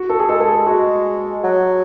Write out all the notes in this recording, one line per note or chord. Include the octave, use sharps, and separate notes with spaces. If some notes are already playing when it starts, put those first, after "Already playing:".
Already playing: F#4
A4
G#4
G#3 A4
A4
G#4
G#3 F#4
F#3